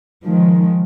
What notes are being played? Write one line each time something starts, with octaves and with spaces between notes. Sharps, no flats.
D#3 F3 G#3